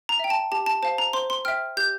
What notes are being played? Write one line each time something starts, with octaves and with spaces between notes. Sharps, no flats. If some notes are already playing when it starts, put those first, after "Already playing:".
A#5
E5 G5
A5
G4 A5
A5
C5 F5 A5
A#5
C5 C6
C6
E5 G5 F6
G4 G6